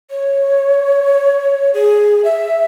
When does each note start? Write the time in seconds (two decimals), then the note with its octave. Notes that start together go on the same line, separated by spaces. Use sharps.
0.10 C#5
1.74 G#4
2.24 E5